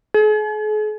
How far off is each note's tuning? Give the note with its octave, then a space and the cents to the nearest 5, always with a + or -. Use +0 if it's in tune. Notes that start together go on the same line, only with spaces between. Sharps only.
G#4 +45